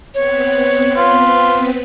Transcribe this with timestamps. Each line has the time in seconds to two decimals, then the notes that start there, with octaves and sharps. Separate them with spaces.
0.14 B3 C4 B4 C#5
0.96 F4